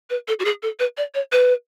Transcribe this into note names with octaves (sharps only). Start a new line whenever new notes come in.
B4
A4
F#4
G#4
A4
B4
D5
C#5
B4